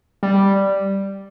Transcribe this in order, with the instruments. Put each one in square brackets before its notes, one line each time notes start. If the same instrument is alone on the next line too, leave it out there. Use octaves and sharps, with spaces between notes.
[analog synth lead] G3